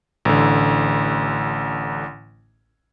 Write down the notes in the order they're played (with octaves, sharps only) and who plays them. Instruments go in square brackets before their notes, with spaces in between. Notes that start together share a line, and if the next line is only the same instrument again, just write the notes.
[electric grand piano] A1 D3